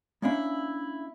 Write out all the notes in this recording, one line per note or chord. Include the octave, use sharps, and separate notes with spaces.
A#3 C#4 D4 E4